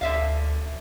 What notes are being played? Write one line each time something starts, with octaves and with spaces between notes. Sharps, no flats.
D2 D3 E5 F5